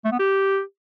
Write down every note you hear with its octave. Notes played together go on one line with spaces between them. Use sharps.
A3
B3
G4